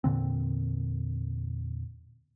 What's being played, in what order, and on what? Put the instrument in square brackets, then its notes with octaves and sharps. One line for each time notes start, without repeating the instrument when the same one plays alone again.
[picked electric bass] E2 A#2 D3 C4